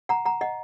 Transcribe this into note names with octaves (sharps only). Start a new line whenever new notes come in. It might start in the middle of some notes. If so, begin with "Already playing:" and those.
F#5 A#5
F#5 A#5
D#5 F#5